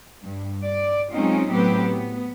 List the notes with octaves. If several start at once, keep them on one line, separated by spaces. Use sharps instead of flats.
G2
D5
F#3 G#3 C4 C#4 D#4 F4
A2 F#3 B3 C4 G4 B4
B3